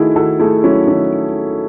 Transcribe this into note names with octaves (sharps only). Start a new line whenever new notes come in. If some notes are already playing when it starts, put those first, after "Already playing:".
Already playing: D#3 A3 D#4 E4 F#4 G#4
D#3 F#4 A4
A3 E4 G#4
F#3 C#4 E4
D#3 C#4